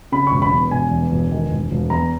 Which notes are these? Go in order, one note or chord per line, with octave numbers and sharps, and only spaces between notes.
C#3 B5
E1 C#6
B5
E2
E1 G#5
E2
E1
D#3
E1
E1
E2 A#5